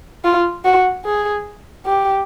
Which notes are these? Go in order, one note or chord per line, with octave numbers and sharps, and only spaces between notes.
F4
F#4
G#4
G4